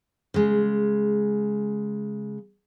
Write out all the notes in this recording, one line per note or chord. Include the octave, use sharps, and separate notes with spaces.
C#3 G#3